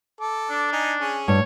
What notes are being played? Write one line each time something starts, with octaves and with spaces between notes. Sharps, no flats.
A4 D6
D4
D#4 G#5
C#4 G#4
G2 C#5